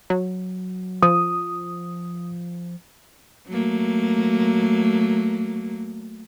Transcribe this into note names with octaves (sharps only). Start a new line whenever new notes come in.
F#3
F3 D#6
F#3 A3 A#3